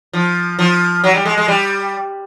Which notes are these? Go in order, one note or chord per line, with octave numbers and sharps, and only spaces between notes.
F3
F3
F#3
G3
G#3
G#3
G3